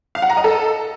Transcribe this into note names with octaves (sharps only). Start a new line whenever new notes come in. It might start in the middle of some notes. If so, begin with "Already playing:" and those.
F5
F#5
A#5
D#5
A4